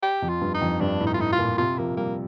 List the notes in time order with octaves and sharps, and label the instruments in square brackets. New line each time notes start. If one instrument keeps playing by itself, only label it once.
[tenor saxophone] G4
[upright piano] F2
[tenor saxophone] F4
[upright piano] G2
[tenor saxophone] D#4
[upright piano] F2
[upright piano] G2 [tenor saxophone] D4
[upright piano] A2
[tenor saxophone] D#4
F4
[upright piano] A2 [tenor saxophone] D#4
[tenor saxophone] F4
[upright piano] A#2
[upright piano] C3 [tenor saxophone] F4
[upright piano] F3 [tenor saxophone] A#3
[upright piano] G3 [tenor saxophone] A#3